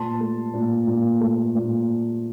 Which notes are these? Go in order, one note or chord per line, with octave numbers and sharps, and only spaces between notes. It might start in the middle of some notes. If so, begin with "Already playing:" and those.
Already playing: A#2 A5 C6
A3
A#2
A#2
A3
A#2